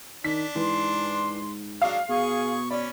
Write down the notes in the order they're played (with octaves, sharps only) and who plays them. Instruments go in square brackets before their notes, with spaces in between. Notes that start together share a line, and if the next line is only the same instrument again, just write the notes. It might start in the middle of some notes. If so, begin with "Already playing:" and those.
[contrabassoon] D#3 [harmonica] D4 [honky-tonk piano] B6
[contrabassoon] G#2 [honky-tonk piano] E3 [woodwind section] C6
[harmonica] F#3 G#3 D4 [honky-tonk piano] F5
[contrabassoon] B2 [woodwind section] G#4 [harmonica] C#6
[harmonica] C#4 B5 [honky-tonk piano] D5